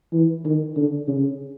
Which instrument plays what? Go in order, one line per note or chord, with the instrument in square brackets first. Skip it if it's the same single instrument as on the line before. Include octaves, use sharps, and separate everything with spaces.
[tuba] E3
D#3
D3
C#3